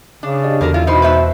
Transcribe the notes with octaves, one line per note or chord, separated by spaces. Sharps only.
C#3 D4
G4 D5 D#5
E2 D3 F#4 A#4 D5
E4 F4
B2 D#4 E4 C5
B4 C5 E5